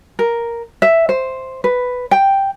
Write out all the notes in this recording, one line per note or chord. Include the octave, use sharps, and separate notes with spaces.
A#4
E5
C5
B4
G5